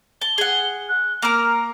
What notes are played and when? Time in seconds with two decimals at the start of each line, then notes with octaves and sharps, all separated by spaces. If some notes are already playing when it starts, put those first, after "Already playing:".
0.21 A5 G7
0.38 G#4 F#5
0.89 F#6
1.22 A#3 A#4 F6